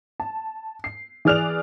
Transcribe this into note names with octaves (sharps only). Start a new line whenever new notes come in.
A5
C7
E3 G#4 D5 F6 F#6 F7